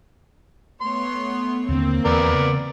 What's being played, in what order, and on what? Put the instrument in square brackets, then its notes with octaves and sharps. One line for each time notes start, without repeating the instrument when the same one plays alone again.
[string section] A3 B3 C#5 [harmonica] C6
[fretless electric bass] D#2 D3 D4 [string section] A#3 C4
[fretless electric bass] E2 E3 [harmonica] B3 A#4 D5
[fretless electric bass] C#3